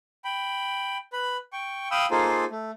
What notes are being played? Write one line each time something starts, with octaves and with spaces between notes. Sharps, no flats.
G5 B5
B4 B5
G5 C#6
F5 G5 B5 D#6 E6
A#3 D#4 F4 G#4 A4 C5
A3